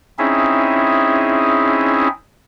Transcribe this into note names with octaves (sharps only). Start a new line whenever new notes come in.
C4 C#4 D#4 E4 G#4 E5